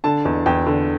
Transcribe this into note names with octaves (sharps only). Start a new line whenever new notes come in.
D3 A5
E2
E2 G5
D3